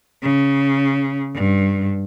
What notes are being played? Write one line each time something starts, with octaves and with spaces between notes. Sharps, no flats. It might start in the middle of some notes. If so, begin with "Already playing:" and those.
C#3
G2